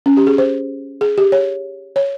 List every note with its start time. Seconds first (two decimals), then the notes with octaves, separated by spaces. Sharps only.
0.06 C#4
0.17 G4
0.27 G#4
0.38 C5
1.01 G#4
1.18 G4
1.32 C#5
1.96 C#5